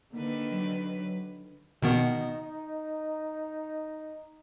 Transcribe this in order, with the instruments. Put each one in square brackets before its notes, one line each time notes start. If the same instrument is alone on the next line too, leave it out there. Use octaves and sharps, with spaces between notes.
[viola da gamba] D3 D#3 B4 [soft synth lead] A#3
[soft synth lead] F#3
[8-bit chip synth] B2 D#3 B3 [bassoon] D#4